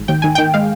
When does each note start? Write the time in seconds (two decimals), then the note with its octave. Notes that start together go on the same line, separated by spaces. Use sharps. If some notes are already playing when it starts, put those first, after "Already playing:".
Already playing: G#1
0.08 D#2 G5
0.22 D#2 G#5
0.35 D#3 G5
0.54 G#3 F5